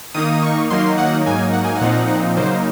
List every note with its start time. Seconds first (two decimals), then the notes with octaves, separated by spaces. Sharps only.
0.14 D#3 A#3 D#4 D#6
0.32 D#6
0.43 C#6
0.70 D#3 F#3 A#3 D#4 C6
0.98 F#5
1.26 G#2 F#3 A#3 D#4 G#5
1.53 F#5
1.65 G#5
1.76 F#5
1.81 A#2 F3 C4 D#4
2.37 C#3 F#3 A#3 D#4 C5